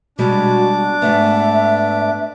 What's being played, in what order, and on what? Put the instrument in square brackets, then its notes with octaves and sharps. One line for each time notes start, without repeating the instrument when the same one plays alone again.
[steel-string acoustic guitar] B2 G3 G#3 [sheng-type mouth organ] D4 D6 [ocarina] F#4
[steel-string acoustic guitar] G#2 A3 B3 [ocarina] E5